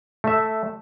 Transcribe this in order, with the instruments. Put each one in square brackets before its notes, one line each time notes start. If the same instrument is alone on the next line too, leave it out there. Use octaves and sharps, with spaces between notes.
[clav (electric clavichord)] A3 E5